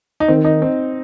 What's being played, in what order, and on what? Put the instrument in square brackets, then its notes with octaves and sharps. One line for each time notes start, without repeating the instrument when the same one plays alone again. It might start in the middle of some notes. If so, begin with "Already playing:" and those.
[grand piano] D#4
[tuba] D#3 [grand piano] C4
[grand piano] D#4
C4